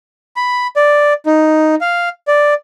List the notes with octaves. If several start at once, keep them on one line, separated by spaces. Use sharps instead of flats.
B5
D5
D#4
F5
D5